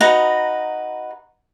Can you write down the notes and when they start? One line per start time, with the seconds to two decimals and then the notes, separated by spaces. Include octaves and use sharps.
0.01 D#4 F#4 B4 A#5